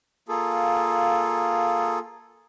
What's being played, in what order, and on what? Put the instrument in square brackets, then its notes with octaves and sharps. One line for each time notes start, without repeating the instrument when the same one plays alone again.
[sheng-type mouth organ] A#3 F4 G#4 A4